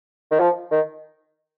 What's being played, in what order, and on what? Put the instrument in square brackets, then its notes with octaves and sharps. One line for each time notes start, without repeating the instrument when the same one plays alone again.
[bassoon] D#3
F3
D#3